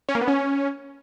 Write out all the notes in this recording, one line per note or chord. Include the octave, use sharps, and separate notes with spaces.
C#4
A#3
B3
C#4